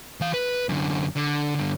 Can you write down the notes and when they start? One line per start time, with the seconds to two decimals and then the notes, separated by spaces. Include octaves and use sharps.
0.21 E3 F5
0.34 B4
0.69 F#2 D3
1.16 D3
1.55 G2 D3